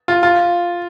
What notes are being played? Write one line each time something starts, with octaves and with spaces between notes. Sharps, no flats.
F4
F4